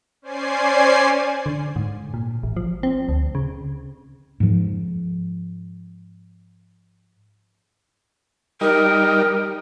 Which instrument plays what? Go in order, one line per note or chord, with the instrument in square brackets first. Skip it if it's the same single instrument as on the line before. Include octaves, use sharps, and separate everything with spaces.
[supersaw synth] C#4 C5 D5 G#5 C7
[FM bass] D3
G#2
A#2
A1
F3
C4
D2
C#3
[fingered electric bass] G#2 F3
[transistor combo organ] G3 D#4 [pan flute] A#4